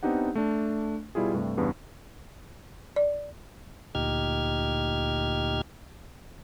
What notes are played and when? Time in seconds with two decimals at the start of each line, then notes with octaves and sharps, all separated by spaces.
0.03 B3 C4 D4 D#4 G4 F#5
0.35 A3 D4
1.15 B2 G3 E4 F4 G#4
1.34 G2 C3 A3
1.57 E2 G2 C#3 B3
2.96 D5
3.95 D2 A#2 D#4 G4 F6 G#6